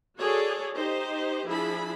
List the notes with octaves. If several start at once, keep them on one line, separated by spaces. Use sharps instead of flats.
F#4 G#4 A4 C#5 D5
D#4 G4 C5 D#5
F3 D4 E4 G#4 B5